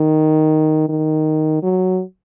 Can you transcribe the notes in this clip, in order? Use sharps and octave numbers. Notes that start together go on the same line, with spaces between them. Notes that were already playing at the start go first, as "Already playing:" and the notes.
Already playing: D#3
D#3
F#3